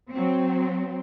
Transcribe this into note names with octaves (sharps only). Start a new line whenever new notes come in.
F#3 C4